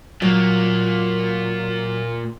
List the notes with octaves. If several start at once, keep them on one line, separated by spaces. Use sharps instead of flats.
A#2 F#3 A#3